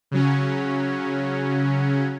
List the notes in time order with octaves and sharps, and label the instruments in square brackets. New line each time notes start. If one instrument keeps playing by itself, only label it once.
[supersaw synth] C#3 F#3 C#4